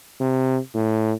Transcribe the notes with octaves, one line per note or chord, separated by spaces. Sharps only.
C3
A2